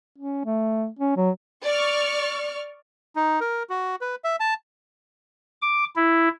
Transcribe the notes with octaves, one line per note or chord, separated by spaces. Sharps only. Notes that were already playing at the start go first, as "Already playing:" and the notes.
C#4
A3
C#4
F#3
D5 C#6 F6
D#4
A#4
F#4
B4
E5
A5
D6
E4